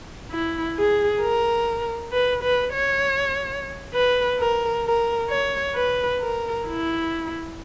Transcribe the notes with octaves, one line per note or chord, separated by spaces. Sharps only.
E4
G#4
A#4
B4
B4
C#5
B4
A#4
A#4
C#5
B4
A#4
E4